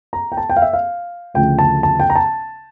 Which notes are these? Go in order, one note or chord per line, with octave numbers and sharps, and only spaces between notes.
A#5
G5
A5
G5
F5
E5
F5
D2 C#3 F3 A3 G5
A5
A5
G5
A#5
A5